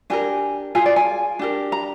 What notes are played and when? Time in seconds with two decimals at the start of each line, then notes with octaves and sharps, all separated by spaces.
0.10 D4 G4 A#4 G#5
0.75 F4 G#5
0.77 G#4
0.86 D5
0.96 G#5
1.39 D4 G4 A#4
1.72 A#5